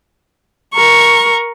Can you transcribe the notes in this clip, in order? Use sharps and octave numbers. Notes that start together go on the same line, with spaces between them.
A#4 C#6